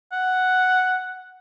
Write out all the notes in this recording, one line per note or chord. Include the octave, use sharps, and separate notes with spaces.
F#5